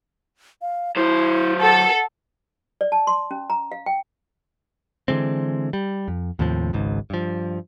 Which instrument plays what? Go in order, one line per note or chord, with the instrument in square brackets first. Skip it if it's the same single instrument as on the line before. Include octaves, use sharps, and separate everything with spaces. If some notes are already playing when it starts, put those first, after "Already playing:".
[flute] F5
[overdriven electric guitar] F#3 C5 [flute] E4
[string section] A4 [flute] F#5
[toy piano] D5
A5
C6
C#4
A#5
F5
G5
[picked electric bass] D3 E3 G#3 C4
G3
F2
D#2 A2 C3 F3
G#1 C#2 G#2
G2 F3